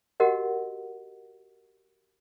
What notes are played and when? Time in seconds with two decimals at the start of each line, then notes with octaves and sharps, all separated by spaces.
0.20 F#4 G4 A#4 D#5 F#5